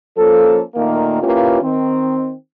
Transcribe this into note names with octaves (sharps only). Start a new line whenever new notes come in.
F3 A#3 C#4 A4
A#2 D#3 A3 A#3
A#3 C#4 E4 F4 G4 B4
D#3 C4